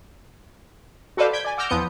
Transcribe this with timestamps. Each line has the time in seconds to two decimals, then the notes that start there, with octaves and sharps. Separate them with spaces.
1.17 F#4 A4 B4 C5 D5 F5
1.33 G6 G#6 B6 D7
1.45 D5 G#5
1.57 F#5 D6 E6 F6 G6 A#6
1.69 E2 F3 B3 D#6 G6 C#7